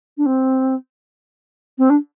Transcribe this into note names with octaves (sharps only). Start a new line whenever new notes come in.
D4
C4
C4
D4